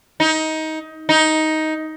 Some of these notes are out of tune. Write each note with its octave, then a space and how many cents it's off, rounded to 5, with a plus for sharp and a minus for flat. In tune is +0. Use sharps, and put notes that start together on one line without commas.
D#4 +20
D#4 +10